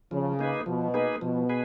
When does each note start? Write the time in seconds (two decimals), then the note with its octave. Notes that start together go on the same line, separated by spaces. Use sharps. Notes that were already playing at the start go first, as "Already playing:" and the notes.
0.11 C#3 F3
0.39 A#3 D#4 G#4 B4
0.66 B2 F3
0.94 A#3 D#4 G#4 B4
1.21 B2 F3
1.49 G#4 B4